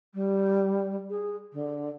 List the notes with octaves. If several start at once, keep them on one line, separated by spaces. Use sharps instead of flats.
G3
G#4
D3